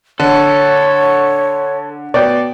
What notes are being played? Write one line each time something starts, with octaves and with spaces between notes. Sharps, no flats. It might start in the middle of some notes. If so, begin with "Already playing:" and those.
D3 A4 C#5
B2 D5 G5